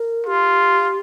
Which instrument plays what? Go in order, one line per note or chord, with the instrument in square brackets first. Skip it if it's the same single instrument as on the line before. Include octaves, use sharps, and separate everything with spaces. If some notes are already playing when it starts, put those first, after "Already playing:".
Already playing: [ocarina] A#4
[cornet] F4 [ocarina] G4